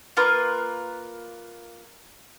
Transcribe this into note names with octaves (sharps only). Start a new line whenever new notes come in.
A#3 F4 A#4 B4